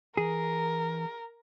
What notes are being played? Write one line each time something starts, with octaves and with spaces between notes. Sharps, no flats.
E3 G#4 A#4